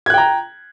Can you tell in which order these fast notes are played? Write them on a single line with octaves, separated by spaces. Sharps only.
G#6 F#6 G5 A#5